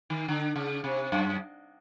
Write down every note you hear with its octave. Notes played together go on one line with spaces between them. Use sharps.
D#3
D3
C#3
C3
F#2